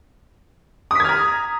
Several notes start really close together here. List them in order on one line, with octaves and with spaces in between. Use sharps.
D#6 B6 G#6 F6 A#5